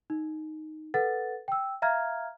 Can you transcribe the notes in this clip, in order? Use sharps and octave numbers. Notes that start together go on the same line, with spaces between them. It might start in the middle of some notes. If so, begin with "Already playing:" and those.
D#4
A4 B4 F#5 A6
G5 E6
E5 F5 A#5 F6 G#6